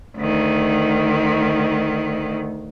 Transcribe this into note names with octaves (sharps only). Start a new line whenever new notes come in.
D2 D#3